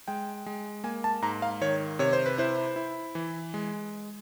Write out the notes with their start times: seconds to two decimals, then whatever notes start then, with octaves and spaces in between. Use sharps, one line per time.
0.08 G#3 G5
0.46 G#3
0.84 A#3 G#5
1.04 A5
1.22 G#2 A#5
1.42 F5
1.61 D#3 C#5
1.99 C3 C#5
2.13 C5
2.26 B4
2.38 E4 C5
2.76 E4
3.15 E3
3.54 G#3